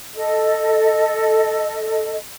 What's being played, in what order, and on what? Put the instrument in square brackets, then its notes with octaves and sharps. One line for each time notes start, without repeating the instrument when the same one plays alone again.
[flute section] A4 D#5